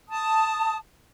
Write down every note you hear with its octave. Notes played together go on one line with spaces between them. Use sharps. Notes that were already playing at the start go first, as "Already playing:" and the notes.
A5 D#6